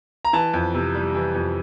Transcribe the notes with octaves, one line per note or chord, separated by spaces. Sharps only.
A#5
E3 A5
F2
C3
G3
E3
F2